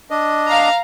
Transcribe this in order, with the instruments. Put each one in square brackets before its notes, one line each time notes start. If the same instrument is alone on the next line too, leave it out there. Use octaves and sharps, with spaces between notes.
[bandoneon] D4 D#5
[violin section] F5 A#5